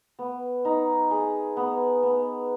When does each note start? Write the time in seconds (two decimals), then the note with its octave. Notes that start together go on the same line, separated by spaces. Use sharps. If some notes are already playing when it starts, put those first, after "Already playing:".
0.19 B3
0.65 D#4
1.11 G#4
1.57 B3
2.03 B3